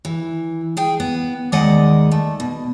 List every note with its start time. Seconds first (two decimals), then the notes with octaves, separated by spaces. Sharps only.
0.05 E3
0.77 G#4 G5
1.00 B3
1.52 D#2 D#3 G#3 D5 D#5 F#5
2.11 A3
2.40 B2